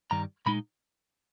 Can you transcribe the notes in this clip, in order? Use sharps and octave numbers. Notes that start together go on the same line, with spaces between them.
G2 D#3 G3 A#5
A#2 G#3 D#4 B5